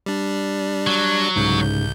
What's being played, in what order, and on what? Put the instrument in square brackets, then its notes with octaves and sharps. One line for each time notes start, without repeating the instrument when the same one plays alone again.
[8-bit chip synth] G3 D4
[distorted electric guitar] F#3
[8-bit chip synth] C2 G6 [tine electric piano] G#2 C#3